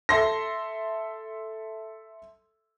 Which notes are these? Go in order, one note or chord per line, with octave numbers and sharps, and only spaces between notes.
A4 E5 C6 A#6